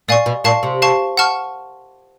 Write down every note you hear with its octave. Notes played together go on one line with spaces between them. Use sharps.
A#2 D5 F5 G#5 C#6
B2
A#2 F5 A5 C#6
C3
F5 A5 C#6
F#5 A5 C#6 F6